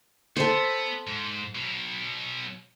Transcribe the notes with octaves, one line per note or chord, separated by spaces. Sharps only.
B3 A4 C5
G#2
B2 F#3